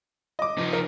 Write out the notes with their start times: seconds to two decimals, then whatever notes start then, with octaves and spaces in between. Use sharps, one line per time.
0.39 D#5 D6
0.58 F3 D#4
0.73 A#4